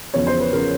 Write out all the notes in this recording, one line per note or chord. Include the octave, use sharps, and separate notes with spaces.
E2 C#3 F3 C#5
C5
B4
C#3 F3 A#4